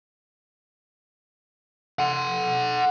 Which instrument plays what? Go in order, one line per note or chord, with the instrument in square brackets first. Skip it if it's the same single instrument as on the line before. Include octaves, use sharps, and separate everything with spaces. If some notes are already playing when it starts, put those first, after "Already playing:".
[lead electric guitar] F#5 C6